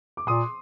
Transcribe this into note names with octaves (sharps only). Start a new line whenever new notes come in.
D6
A#2 C6 D#6